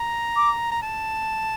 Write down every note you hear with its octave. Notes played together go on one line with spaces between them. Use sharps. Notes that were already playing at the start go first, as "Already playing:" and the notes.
Already playing: A#5
D6
A#5
A5